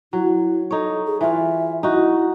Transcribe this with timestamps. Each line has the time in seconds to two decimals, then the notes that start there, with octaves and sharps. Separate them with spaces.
0.13 F#3 E4
0.71 D#4 A4 C#5
1.07 G#4
1.21 E3 F4 E5
1.83 D#4 E4 F#4